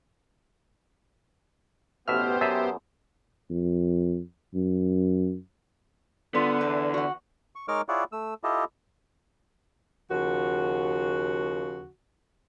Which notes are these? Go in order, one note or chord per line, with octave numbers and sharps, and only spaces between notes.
A1 B2 B3 G4 C5 E5 F6
F#2 G#4 E5 A5
F2
F#2
D3 G3 B3 F4
E2 B4
F#4 F#5
C#6
G#3 D#4 A#4 C#5 D6 F6
E4 F4 G#4 C#5 D5 F#5
A3 E6
E4 F4 G4 A4 D#5
D#2 C#3 F3 F#4